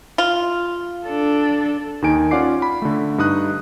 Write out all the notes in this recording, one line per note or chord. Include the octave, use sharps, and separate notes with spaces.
F4
D4 A4
D#2 D#3 D#4 G#5 D7
C#4 F4 D5 F#5 D6 C7
B5
D3 A3
G2 D#4 D#6 F#6